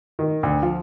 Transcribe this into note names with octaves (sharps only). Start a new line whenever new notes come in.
D#3
D2
F3